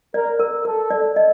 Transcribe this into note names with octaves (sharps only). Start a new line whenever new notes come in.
A#4 D5
A#4
A4 A#4
D5
D#5